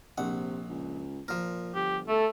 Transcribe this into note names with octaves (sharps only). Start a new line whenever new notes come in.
A#1 C3 F#5
C#2
A#2 F3 A#4
G1 G4
A3 A4